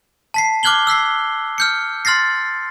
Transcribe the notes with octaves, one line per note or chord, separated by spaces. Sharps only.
A5 B6 C7
D6 F6 F#6 G#6 F#7 G7
E6 F#6 B6 C7
F6 G6 C#7
C6 F6 A6 A#6 C7